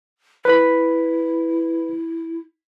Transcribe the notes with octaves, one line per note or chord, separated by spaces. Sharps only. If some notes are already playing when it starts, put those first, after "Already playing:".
E4 B4 B5